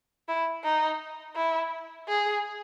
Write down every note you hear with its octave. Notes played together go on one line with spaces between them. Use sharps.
E4
D#4
E4
G#4